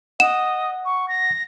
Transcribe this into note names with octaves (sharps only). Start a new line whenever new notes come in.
D#5 F#5 E7
C#6
A#6